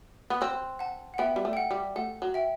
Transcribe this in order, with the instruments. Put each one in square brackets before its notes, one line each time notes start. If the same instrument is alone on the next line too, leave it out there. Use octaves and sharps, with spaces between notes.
[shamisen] B3 [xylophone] F#6
[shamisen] C4 [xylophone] C6 E6
[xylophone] F#5 A5
F#5
[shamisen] B3 [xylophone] E5 G5
[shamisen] G3
A3
[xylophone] G5
F#5
[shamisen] G3
[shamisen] A3 [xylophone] F#5
[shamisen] F#3
[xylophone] E5 G5